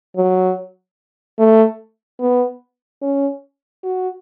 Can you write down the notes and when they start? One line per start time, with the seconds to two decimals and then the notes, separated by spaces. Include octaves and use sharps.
0.16 F#3
1.39 A3
2.20 B3
3.02 C#4
3.84 F#4